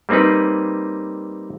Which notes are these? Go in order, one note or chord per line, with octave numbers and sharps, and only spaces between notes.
G3 A#3 C4 D#4 B4